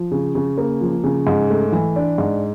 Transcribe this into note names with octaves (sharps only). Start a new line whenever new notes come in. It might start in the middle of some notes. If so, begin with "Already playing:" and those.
Already playing: F3
C#3
C#3
A#3
F3
C#3
G#2
A3
E3
D4
G#2